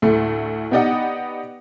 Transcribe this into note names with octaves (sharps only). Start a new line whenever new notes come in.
D2 A2 A3
B3 D#4 G4 D5 D#5 F#5